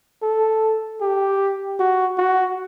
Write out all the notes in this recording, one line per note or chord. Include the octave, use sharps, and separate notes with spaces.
A4
G4
F#4
F#4